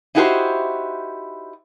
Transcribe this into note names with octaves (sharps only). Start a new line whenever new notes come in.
D#4 E4 F#4 G4 A4 C5